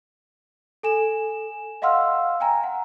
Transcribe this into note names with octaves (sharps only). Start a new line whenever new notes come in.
A4 G#5 E7
D#5 F5 F#5 C6 E6 F6
G5 G#5 A#5
F#5